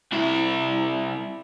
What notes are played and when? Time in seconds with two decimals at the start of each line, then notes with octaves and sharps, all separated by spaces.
0.12 C2 E4